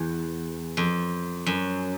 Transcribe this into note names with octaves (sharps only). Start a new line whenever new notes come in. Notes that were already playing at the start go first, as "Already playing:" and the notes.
Already playing: E2
F2
F#2